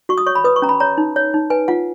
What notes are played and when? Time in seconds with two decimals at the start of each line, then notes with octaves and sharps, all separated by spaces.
0.09 F#4 C#6
0.18 D#6
0.26 C#5 C#6
0.35 B5
0.44 B4 D#6
0.56 C#6
0.62 C#4 A#5
0.69 B5
0.80 C#5 A#5
0.98 D#4
1.16 C#5
1.34 D#4
1.50 B4 G#5
1.68 F4 F#5